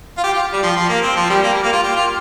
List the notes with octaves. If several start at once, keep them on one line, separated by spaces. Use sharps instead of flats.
F4
G4
F4
G3
F3
F3
A#3
C4
F3
G3
A#3
G3
A#3
F4
G4
F4